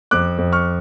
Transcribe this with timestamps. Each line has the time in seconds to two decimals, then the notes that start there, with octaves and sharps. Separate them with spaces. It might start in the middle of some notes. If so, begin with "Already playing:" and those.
0.11 F2 D6 F#6
0.38 F2
0.52 C#6 F6